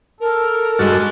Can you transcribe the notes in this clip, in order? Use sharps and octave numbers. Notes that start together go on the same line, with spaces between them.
A4 A#4
G2 G#3 F#4 A5